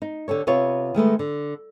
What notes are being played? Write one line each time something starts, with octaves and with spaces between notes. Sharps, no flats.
D#4
D3 G4 A4 C#5
C3 B3 F4 C#5
D#3 G#3 A3 B3
D3